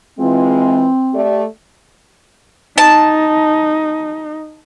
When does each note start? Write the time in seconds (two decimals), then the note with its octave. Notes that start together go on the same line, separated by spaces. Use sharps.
0.19 E3 G#3 C4 F4
1.14 A3 G4 D5
2.78 D#4 A5